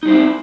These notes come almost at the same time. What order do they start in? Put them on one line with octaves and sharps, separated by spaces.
D#4 G3 C5 E4 C4